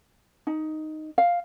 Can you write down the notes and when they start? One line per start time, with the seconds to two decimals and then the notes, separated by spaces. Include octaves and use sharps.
0.47 D#4
1.18 F5